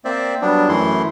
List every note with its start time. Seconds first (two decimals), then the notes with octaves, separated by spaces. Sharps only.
0.05 A#3 C4 C5 D5 E5
0.42 F#3 G3 B3 D4
0.69 F#2 E3 A3 E4 C6